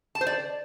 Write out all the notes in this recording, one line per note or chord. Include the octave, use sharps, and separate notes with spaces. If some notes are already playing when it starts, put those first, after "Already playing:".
A5
C5
D5